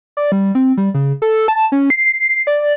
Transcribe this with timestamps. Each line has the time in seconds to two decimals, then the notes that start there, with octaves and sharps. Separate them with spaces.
0.17 D5
0.32 G3
0.55 C4
0.77 G3
0.94 C#3
1.22 A4
1.48 A5
1.72 C#4
1.90 C7
2.47 D5